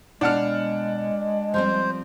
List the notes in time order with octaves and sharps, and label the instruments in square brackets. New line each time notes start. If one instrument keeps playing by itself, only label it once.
[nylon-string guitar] B2 F5 [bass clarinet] G#3 [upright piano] D4 F#5 F6
[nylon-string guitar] F3 G3 C4 [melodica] C5